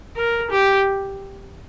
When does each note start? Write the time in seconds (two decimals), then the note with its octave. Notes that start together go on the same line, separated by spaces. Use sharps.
0.16 A#4
0.51 G4